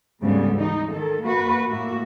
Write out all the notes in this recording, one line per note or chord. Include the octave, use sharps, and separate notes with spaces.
D2 G#2 C#3 G3 A3 B3
E3 D#4
D#3 A4
A#3 F#4 B4
A2 A#3 F#4 E5